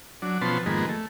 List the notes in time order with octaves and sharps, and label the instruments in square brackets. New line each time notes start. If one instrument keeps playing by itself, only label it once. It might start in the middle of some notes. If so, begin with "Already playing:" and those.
[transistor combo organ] F#3 D4
B2 F3 B3 C#4 A5 C6
F2 G#2 D#3 G#3 A#3 B3
A3